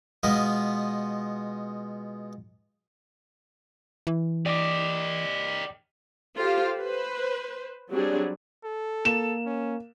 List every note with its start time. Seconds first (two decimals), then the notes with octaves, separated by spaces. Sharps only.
0.23 B2 G#3 B3 F4 D#5
4.07 E3
4.46 G4 D5 D#5 D6
6.37 F4 G4 A4 C5 F5
6.79 B4 C5
7.91 F#3 G3 C4 D4 G#4
8.64 A4
9.05 A#3 E7
9.46 C#4